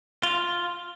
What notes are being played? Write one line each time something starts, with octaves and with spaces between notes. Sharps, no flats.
F4